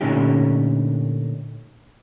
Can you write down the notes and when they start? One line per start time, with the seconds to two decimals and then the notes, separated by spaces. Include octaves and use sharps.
0.01 A#2 D3 A3 C#4 D#4 G4